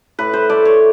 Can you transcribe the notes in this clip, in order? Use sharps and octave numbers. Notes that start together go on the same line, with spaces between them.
A2 B4
C5
A3 D5
C#5